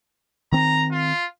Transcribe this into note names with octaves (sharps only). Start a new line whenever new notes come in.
D#3 C4 A#5
F4